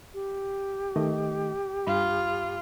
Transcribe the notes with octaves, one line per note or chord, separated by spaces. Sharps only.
G4
D#3 A3 D#5
G2 F4 B5